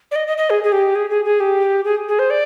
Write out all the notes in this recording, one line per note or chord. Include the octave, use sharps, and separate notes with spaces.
D5
D#5
D#5
D#5
G#4
G#4
G4
G#4
G#4
G#4
G4
G#4
G#4
C5
D5